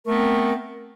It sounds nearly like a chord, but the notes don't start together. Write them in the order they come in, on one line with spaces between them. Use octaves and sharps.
A#4 A3 B3 C4